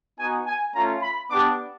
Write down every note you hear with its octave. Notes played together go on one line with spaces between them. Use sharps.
B3 D#4 F#4 G#5
G#5
A3 C#4 F4 A#5
B5
B3 D4 G4 D6